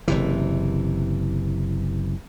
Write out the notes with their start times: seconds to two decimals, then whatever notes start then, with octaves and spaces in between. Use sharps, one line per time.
0.08 F#1 C3 E3